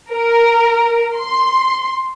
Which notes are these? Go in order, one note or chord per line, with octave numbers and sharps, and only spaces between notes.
A#4
C6